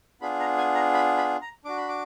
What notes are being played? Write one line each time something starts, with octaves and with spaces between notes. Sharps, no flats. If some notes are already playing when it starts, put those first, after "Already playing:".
B3 D4 F4 G#4 B5
A#5
G#5
A#5
B5
B5
A#5
D4 F#4 D6
B5
D6